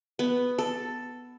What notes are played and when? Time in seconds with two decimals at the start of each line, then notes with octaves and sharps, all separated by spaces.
0.19 B3
0.58 A4